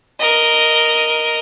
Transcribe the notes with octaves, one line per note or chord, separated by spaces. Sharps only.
A#4 D#5